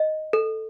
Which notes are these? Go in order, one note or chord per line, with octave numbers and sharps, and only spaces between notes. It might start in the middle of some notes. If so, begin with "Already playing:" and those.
Already playing: D#5
A4